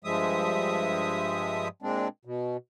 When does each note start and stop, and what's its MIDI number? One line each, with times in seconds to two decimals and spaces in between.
0.04 1.68 43
0.04 1.68 53
0.04 1.68 56
0.04 1.68 76
0.04 1.68 87
1.82 2.08 46
1.82 2.08 56
1.82 2.08 60
1.82 2.08 62
2.25 2.57 47